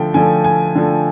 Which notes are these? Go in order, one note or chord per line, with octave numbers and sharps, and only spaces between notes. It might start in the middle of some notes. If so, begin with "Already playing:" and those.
Already playing: D3 F3 A3 G5
D3 F3 A3 G#5
G#5
D3 F3 A3